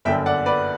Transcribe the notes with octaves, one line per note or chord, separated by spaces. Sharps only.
G1 F#2 D3 E5 G5
D5 F#5
B4 D5